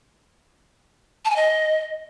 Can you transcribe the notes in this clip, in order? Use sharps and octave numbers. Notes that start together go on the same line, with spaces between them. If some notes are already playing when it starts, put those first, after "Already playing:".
A5
G#5
D#5